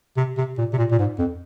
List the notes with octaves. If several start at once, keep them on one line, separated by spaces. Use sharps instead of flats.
C3
C3
A#2
C3
A#2
A#2
G#2
F2